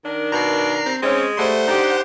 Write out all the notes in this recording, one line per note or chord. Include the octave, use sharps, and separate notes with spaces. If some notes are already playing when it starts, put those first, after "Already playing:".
D#3 D4 A#4
B2 A#5 C7
C4
G#3 C4 C#4
G3 A3 C5 F#5 C6
D4 D#4 G4